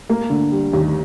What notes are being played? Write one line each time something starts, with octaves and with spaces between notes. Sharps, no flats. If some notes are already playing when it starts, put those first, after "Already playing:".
A#3
D3
G3
D#2